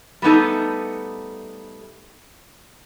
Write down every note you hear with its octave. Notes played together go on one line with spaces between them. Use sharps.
G3 A3 B3 D#4 A4